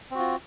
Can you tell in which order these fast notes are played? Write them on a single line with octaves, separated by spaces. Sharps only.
C4 F#4 F4